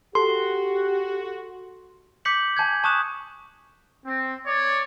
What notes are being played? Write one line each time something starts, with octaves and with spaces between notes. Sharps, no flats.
F#4 G4 A4 C6
D6 G6 B6 C#7 F#7
G#5 A5 G6 G#6
A5 C#6 D#6 F#6 E7
C4
C#5 D5